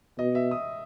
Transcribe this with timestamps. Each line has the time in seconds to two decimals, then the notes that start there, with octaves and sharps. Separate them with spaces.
0.18 B2 D#5
0.35 E5
0.51 D#6